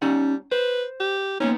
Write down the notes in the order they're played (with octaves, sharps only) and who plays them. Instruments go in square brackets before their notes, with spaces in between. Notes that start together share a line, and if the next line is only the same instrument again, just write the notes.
[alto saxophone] G3 [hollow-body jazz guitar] C#4 D#4 F#5
[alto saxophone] B4 [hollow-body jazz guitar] C5
[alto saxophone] G4
[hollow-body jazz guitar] A#3 B3 D#4 [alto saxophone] C#4